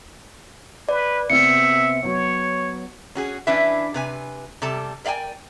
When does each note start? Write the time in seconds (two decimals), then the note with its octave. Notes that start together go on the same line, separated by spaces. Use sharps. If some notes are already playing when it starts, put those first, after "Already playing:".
0.89 B4 D5
1.30 C3 B3 C4 E5 C#7
2.03 F#3 B3 C#5
3.15 C#4 F#4 G#4
3.47 E3 C#4 D4 E4 B4 E5
3.94 C3 B4 G#5
4.62 C3 G3 A4 A5
5.05 A#4 D5 F5 G5 G#5